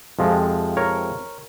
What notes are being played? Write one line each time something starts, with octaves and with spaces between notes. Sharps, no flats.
F2 C3 F3 G#3
A#4 C#5